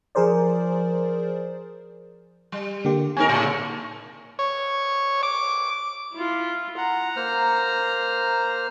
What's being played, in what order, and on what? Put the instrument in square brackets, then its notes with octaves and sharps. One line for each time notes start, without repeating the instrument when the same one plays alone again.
[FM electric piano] F3 G#4 A#4 C5 D5
[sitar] G3
[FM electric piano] D3 A#3 G4
[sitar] C4 D#4 A#4 [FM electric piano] G#5
[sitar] A2 C#3
[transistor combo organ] C#5
D6
[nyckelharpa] E4 F4
[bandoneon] F#5 [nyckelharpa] A#5
[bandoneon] A#3 C5 F6